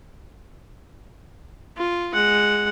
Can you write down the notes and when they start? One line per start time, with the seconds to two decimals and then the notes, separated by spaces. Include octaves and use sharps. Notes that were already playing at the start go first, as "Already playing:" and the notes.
1.77 F4
2.14 G#3 F#5